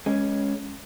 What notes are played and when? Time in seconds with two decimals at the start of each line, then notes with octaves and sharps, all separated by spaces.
0.06 G#3 C#4